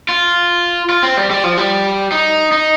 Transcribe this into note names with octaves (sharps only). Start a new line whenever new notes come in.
F4
F4
C4
G3
G3
F3
G3
D#4
D#4